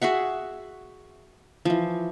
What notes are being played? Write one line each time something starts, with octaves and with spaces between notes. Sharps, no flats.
F#4 G#4 E5 F#5
E3 F3